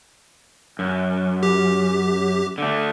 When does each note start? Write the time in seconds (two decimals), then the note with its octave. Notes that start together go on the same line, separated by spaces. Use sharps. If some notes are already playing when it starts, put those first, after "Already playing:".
0.79 F#2
1.43 G4
2.58 D3 A3